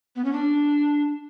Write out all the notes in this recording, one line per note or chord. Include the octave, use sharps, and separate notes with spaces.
B3
C#4
D4